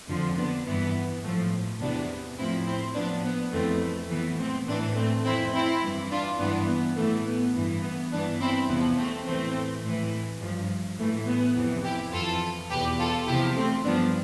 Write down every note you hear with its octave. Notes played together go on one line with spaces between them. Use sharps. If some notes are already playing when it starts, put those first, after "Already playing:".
F2 D3 F3
B3 D4
G2 E3 B3
A2 F3 A3
E2 C3 E3 B3 D4
A2 F3 C4 E4
C4 E4
A2 F3 B3 D4
B3
F2 E3 A3 C4
A3
A2 E3 B3
A3 C4
A2 E3 B3 D4
A3 C4
F2 E3 C4 E4
C4 E4
G2 E3
D4 F4
G2 E3 B3 D4
B3
A2 E3 A3
B3
G2 E3
B3
G2 E3 B3 D4
C4 E4
E2 C3 F3 B3 D4
A3 C4
A2 E3 A3 C4
A2 E3
G2 F3
A2 E3 A3
B3
F2 C3 E3
E4 G4
F2 E3 F4 A4
E2 B2 G4 B4
F4 A4
E2 C3 F3 E4 G4
A3 C4
G2 F3 B3 D4